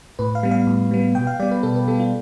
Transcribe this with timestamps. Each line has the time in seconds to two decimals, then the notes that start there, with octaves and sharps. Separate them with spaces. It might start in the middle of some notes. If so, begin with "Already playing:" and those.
0.19 A2 B4
0.35 F5
0.43 G3 B3
0.51 F5
0.67 A2
0.91 G3 B3
1.15 B2 G5
1.27 F5
1.40 G3 B3 D5
1.51 B4
1.63 B2 A4
1.76 B4
1.87 G3 B3 A4
2.00 F4